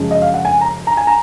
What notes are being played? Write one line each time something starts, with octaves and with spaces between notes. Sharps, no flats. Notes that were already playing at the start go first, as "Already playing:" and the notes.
Already playing: F#2 C#3 F3 G#3
D#5
F5
F#5
G#5
A#5
A#5
G#5
A#5